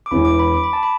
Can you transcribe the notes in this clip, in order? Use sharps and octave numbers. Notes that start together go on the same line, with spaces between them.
D6
E1 E2 E3 B5
D6
B5
D6
B5
A5
B5